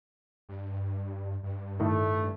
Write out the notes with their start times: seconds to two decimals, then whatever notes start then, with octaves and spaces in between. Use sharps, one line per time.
0.49 G2
1.43 G2
1.80 A2 D#3 A3